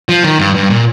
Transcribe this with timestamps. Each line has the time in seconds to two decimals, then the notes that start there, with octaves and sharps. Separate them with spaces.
0.09 F3
0.24 D#3
0.39 G2
0.55 G2
0.70 A#2